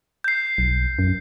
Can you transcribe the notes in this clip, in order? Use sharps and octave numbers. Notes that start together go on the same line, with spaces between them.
G6 C7
B1
F#2